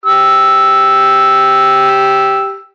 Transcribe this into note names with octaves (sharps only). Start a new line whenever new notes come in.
G4 E6